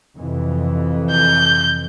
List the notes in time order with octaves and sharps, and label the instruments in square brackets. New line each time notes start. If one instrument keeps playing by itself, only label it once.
[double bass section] F2 C3 E3
[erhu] G6